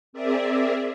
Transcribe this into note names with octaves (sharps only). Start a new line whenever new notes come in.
C4 G#4 A#4 D5 E5